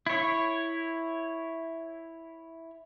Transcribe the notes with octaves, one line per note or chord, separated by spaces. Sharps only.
E4 C#5